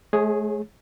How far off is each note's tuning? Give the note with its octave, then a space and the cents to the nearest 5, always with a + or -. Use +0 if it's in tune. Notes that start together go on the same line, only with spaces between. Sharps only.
A3 -45 G#4 +0 C#5 -25